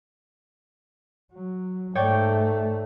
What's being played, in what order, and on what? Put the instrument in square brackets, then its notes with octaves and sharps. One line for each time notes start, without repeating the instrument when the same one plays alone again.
[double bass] F#3
[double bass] G#2 A3 [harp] C#5 D5 G5